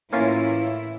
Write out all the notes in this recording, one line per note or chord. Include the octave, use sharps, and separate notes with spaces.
A2 E3 A#3 C#4 E4 F4